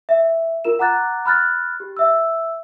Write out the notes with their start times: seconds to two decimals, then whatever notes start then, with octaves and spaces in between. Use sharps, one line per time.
0.09 E5
0.64 F4 A#4 E7
0.79 F#5 A#5 D6 F#6 A6
1.26 B5 F6 F#6 A6
1.80 G4
1.97 E5 E6